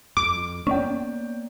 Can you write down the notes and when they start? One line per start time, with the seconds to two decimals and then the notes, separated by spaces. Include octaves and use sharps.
0.17 F2 D6
0.67 A#3 B3 C#4 C#5 D5 G5